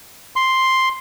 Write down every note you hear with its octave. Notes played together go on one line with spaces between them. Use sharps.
C6